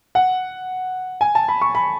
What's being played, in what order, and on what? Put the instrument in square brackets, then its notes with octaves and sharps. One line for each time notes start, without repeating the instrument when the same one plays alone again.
[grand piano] F#5
G#5
A5
B5
C#6
B5